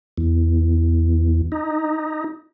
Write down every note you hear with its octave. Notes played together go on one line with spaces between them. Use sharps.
E2
D#4